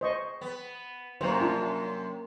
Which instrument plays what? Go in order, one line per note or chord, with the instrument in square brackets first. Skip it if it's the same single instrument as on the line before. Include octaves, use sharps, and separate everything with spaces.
[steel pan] C5 D#5 C#6
[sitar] B3
[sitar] F#2 C3 [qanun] A#3 C#4 [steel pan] C5
[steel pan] D4 F4